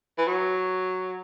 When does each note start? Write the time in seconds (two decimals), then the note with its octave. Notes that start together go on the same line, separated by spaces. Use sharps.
0.18 E3
0.27 F#3